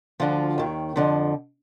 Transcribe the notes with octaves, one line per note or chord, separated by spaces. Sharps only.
D2 D3 F3 F4
D#2 D#3
F2 D3 F3